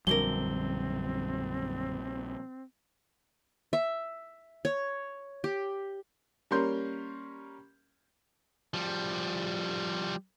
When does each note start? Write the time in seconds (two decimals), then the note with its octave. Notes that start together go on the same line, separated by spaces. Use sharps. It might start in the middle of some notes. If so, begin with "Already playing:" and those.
0.07 A#1 F#2 D3 G3 C4 A#4 G7
3.73 E5
4.65 C#5
5.44 G4
6.51 G3 A#3 C#4 A#4 C6 G6
8.74 F3 G3